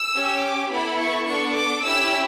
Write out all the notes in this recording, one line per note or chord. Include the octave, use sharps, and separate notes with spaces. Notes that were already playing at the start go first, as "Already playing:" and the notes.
Already playing: E6
C#4 G4
D6
B3 E4 A4 B5
C#6
B3 D4 A4 C#6
D6
C#4 E4 G4 E6